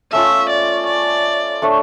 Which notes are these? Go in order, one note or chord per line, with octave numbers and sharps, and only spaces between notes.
A3 C#4 F4 E5
D5
D5
A3 D4 A4 C#5